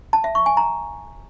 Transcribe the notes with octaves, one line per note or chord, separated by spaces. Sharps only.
A5
E5
C#6
G#5
A#5